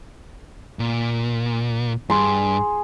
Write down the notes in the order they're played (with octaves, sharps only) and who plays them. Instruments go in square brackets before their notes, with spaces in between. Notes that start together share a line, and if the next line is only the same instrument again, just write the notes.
[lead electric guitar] A#2
[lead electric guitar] G2 [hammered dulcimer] G#4 C6